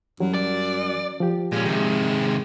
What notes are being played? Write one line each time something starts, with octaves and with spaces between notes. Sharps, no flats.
F#2 E3 F#3 G3
D5
F3 G4
A#2 G#3 C#4
C3 D#3 G#3